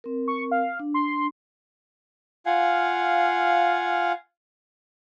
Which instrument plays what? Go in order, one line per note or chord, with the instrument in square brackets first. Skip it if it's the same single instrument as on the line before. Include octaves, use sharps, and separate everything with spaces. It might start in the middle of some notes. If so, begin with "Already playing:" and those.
[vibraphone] C4 A#4
[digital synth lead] C#6
F5
[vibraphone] D4
[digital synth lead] C6
[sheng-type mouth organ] F4 F5 F#5 G#5